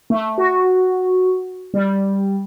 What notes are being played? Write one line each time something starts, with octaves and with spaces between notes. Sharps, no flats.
A3
F#4
G3